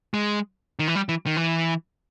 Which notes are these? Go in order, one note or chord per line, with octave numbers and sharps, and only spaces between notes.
G#3
D#3
E3
G3
E3
D#3
E3